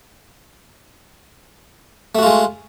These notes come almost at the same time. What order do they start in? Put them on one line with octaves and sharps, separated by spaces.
A3 F#4 F4 G#3